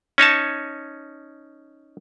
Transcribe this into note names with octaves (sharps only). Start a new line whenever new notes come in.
C#4 D#4 C#5 A5